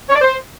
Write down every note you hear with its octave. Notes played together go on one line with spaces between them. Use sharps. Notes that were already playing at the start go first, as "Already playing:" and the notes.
C#5
D5
C5